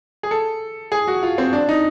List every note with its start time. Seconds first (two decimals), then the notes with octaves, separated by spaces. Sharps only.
0.23 G#4
0.31 A4
0.92 G#4
1.08 F#4
1.23 F4
1.38 C4
1.53 D4
1.69 D#4